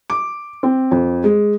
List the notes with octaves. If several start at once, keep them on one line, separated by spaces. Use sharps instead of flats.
D6
C4
F2
G#3